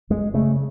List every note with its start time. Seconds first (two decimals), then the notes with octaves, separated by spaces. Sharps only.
0.10 F#2 G#3
0.34 C#3 A3